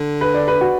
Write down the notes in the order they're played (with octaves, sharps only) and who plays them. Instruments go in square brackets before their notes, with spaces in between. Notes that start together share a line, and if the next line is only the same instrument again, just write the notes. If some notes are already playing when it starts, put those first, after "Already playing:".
Already playing: [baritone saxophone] D3
[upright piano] B4
D5
B4
F#4